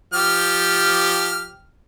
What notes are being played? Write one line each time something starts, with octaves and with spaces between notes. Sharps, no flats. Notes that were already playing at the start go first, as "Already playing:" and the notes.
F3 G4 F6